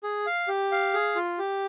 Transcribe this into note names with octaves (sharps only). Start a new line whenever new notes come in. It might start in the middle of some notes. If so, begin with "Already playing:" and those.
G#4
F5
G4
F5
G#4
F4
G4